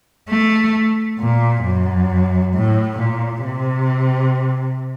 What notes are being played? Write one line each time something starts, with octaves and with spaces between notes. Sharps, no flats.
A3
A#2
F#2
A2
A#2
C3